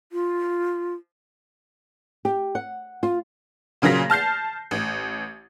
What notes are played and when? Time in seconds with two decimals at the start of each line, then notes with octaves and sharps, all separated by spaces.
0.12 F4
2.25 G4
2.55 F#5
3.03 F4
3.82 A#2 C#3 F#3 A#3 A#6 B6
4.10 A5 F6 G6 C7
4.71 A1